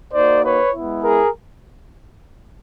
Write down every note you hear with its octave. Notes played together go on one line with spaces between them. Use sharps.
A#3 D#4 F#4 C5 D5
B4 C#5
G#3 B3 E4
G#4 A#4